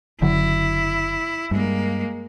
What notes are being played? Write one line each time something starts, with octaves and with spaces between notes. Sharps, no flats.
F#1 D3 F#3 E4
G2 G#3 A#3